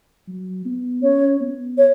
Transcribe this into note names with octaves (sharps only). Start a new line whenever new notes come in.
F#3
B3
C#4 C#5
B3
C#5